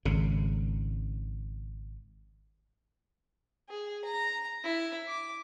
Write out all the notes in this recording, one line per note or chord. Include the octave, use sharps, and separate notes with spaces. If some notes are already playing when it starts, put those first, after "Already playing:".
G#1 C#3
G#4
A#5
E4
D6